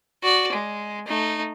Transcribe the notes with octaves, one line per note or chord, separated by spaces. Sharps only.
F#4 D5
G#3
A3 D#4